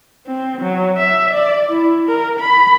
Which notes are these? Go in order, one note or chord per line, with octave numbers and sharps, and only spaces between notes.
C4
F#3
E5
D5
E4
A#4
B5